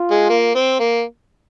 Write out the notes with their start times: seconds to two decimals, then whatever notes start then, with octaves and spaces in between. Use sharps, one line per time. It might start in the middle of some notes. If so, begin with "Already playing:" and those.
Already playing: F4
0.11 G#3
0.29 A#3
0.55 C4
0.80 A#3